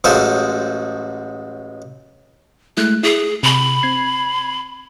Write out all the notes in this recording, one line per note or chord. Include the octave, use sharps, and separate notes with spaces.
A1 F#3 G#3 F4 A4 C5
G#3 A3 E4 F#6
E4 G#4
C3 B5
C4 G#6 C7